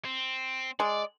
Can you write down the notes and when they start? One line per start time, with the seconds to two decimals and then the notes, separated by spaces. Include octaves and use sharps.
0.05 C4
0.80 G#3 D5